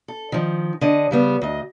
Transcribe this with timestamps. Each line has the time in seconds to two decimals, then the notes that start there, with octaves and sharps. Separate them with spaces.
0.08 A4
0.32 D#3 F3
0.81 D3 D#5
1.11 C#3 G3 B3
1.42 D2 D#5